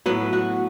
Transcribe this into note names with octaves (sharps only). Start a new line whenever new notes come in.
A2 F#3 B3
F#4